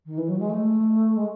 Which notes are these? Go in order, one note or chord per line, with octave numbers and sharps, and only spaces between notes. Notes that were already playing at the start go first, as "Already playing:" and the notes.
D#3
E3
F#3
G#3
A3
G#3